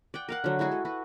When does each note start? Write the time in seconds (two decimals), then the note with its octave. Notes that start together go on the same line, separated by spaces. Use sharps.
0.14 D5 F#5 G5
0.29 A#4 F5 F#5
0.44 D3 F#3
0.59 G#3 E4 F#4 G#4
0.71 A4
0.85 F#4 B4